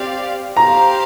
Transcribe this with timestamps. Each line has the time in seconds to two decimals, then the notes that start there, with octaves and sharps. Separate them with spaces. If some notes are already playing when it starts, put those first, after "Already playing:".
Already playing: C4 G4 D5 F5
0.57 G4 C5 F5 A#5